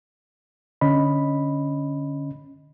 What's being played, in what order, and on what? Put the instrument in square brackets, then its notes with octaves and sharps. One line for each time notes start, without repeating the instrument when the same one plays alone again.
[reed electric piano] D3 C#4 D#5 B5